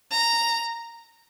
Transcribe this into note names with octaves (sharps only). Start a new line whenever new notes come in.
A#5